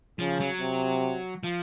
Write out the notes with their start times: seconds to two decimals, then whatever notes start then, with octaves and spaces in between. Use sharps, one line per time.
0.19 C#3 F3
0.40 F#3
0.60 C3
1.43 F3